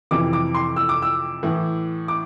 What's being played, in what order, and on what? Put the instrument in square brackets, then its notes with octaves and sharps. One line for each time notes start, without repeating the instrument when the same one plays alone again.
[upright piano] F2 C3 E3 D6
D6
C6
E6
D6
E6
A2 E3
D6